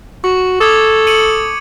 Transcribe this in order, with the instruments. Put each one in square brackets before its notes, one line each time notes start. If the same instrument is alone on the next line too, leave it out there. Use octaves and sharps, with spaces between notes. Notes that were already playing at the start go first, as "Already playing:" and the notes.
[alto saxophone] F#4 [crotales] C#6
[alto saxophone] A4 [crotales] D6 D#6 G#6
[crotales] C#7 D#7 F#7